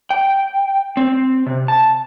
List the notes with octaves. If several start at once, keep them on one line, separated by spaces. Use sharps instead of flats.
G5
C4
C3
A5